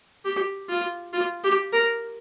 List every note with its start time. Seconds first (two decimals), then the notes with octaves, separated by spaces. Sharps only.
0.25 G4
0.69 F4
1.13 F4
1.44 G4
1.73 A#4